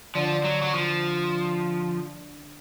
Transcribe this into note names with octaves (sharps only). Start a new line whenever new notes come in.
D3 F3
F#3
F#3
F3